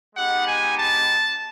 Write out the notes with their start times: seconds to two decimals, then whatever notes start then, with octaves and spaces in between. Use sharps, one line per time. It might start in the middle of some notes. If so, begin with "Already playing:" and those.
0.15 G#3 B3 D#4 G4 F#5
0.47 G#5
0.78 A5